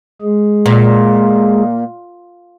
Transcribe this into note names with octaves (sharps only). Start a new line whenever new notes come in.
G#3 G#4
A#2